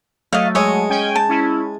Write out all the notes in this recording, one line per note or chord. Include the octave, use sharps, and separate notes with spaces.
F#3 A3 D#5 F5
G#3 C#5 D#5
C#4 G5 G#5
A5
C#4 E4